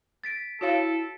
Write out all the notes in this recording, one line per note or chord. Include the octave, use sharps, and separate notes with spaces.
A6 B6 D7
E4 F#4 A4 C#5 F5